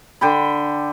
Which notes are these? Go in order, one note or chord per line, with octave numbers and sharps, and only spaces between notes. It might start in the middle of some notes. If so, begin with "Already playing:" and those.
D3 G5 B5